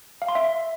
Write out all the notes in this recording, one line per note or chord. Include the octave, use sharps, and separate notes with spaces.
F5
C6
E5